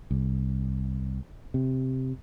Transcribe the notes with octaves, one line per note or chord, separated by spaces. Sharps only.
C2
C3